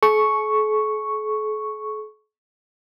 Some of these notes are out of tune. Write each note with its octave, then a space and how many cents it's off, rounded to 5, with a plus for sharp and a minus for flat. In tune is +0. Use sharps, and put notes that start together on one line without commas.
A4 -45 C#6 +0